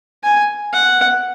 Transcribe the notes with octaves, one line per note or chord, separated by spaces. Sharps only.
G#5
F#5